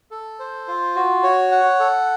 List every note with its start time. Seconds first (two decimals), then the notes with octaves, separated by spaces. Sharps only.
0.11 A4
0.39 C5
0.68 F4
0.96 F#4
1.23 C#5
1.51 F#5
1.80 A4